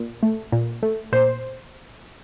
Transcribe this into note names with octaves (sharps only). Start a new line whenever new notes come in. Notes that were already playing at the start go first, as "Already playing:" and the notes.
Already playing: A#2
A3
A#2
A3
A#2 C5